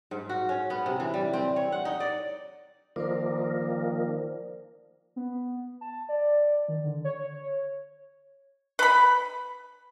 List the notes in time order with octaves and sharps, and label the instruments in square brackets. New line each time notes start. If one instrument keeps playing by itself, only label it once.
[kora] G#2
F#4
C#4
B3
C3
E3
G3
C4
C#5
F#5
D#4
D5
[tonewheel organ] D#3 F3 A#3 [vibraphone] A#4 C5 D5
[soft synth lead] B3
A5
D5
D#3
D3
C#5
[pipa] B4 B5